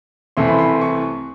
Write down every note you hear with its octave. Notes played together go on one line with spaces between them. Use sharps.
C2 C3 E3 A3 C6
B5
C6
C#6